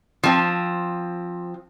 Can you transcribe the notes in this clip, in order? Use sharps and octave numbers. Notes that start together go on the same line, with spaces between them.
F3 C4